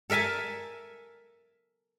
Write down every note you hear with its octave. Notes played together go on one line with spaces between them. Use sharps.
A4 A#4 E5 G#5 A5